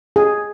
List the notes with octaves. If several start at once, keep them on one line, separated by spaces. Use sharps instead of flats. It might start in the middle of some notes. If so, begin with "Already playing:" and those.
G#4